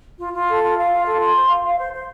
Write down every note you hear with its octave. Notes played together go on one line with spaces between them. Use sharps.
F4
F4
A4
F4
F5
F4
A4
C6
C5
F5
F5
C5
C5